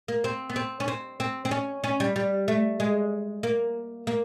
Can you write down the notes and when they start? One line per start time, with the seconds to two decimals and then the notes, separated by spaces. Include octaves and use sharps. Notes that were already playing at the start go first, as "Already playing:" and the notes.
0.08 A#3
0.24 C4
0.50 B3
0.56 C4
0.80 C#4
0.88 C4
1.20 C4
1.45 C4
1.51 C#4
1.84 C#4
2.00 G3
2.16 G3
2.48 A3
2.80 G#3
3.43 A#3
4.07 A#3